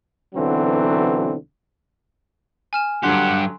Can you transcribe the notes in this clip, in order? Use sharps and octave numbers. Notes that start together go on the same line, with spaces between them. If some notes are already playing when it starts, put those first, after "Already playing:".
B1 D3 E3 F#3 C4
G#5 F6 E7
G2 D3 F#3 G4 F#5 C6